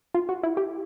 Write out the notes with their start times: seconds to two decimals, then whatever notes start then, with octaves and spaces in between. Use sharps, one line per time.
0.15 F4
0.29 F#4
0.43 E4
0.57 G4